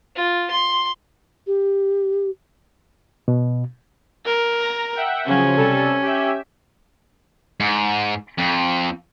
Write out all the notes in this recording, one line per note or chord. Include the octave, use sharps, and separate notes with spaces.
F4
C6
G4
B2
A#4
A#5 A#6
E5 F#5 G5
C#3 F3 F#3 C#4
C3 G3 A4
G4 E5
G#2
F2